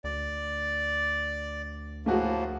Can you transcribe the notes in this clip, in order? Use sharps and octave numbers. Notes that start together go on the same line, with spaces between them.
D2 D5
A2 F3 A3 A#3 F#4 G#4